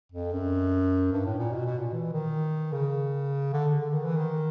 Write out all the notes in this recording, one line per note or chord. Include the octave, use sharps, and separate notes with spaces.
F2
F#2
G2
A2
A#2
B2
B2
A#2
E3
D#3
C#3
D3
D3
D#3
E3
D#3